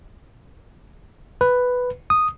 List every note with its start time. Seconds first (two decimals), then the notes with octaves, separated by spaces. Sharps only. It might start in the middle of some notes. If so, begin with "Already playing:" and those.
1.41 B4
2.10 D#6